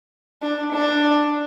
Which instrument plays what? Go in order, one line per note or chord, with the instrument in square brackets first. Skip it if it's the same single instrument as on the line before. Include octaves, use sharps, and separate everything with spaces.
[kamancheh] D4
D4